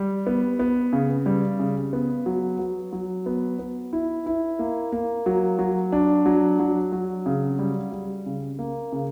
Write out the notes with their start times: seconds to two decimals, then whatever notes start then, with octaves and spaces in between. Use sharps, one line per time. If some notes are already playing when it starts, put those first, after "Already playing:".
Already playing: G3
0.27 B3
0.59 B3
0.93 C#3
1.26 G3
1.59 C#3
1.93 B3
2.26 F#3
2.59 F#3
2.93 F#3
3.26 B3
3.59 B3
3.93 E4
4.26 E4
4.59 A#3
4.92 A#3
5.26 F#3
5.59 F#3
5.92 D4
6.26 F#3
6.59 F#3
6.92 F#3
7.26 C#3
7.59 G3
7.92 G3
8.26 C#3
8.59 A#3
8.92 C#3